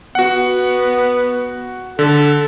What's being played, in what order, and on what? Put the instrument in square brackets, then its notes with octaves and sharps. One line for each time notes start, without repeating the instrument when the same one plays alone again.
[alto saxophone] B3 [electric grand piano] F#4 F#5
[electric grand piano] D3 [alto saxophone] A4